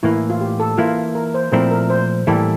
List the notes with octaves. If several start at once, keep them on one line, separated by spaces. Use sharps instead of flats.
A2 E3 A#3 E4
F4
G4
A4
E3 A#3 E4 F4
A#4
C5
A#2 F3 A3 C4 E4 A#4
A#4
C5
A2 E3 G3 A#3 E4 A4